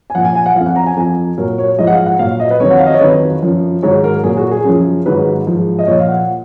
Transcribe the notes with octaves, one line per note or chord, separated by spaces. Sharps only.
G#5
A#2 F3 F#5
G#5
G#5
F#5
F2 F3 F5
F#5
A#5
G#5
F2 F3 G#5
A#2 F#3 A#4
C#5
G#2 F3 D#5
F#5
F5
F#5
A#2 F#3 F5
D#5
B4
F2 D#3 F#3 C#5
F#5
F5
D#5
C#5
F2 D#3 F#3 B4
F#2 F3
G#2 D#3 F#3 C#5
A#4
A#2 F#3 G#4
F#4
G#4
F#2 C#3 F3
G#2 D#3 F#3 B4
G#2 F3
D#5
A#2 F3 C#5
F5
F#5